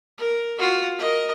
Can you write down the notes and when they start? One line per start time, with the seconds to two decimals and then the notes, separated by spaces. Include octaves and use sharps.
0.18 A#4
0.59 F4 F#4
0.98 A#4 D#5